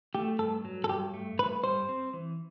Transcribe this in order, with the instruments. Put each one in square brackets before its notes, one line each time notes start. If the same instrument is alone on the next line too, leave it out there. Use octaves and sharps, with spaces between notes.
[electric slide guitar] A3 [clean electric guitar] G4
[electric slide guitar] G2 [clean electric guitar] A4
[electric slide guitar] F#3
[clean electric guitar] A4
[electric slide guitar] G2 [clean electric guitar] G4
[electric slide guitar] A3
[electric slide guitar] G2 [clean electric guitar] B4
[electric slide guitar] G3 [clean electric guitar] C5
[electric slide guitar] C4
E3